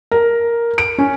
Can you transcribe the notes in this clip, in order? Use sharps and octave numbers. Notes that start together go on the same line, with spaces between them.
A#4
D7
C#4